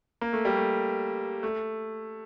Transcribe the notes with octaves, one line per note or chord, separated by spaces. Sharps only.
A#3
A3
G3
A3
A3